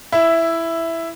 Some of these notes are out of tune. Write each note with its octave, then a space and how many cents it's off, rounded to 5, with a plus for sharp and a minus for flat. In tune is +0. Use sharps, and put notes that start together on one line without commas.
E4 +5 E5 +0